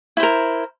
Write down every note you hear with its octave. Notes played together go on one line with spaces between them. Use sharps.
E4 A#4 C5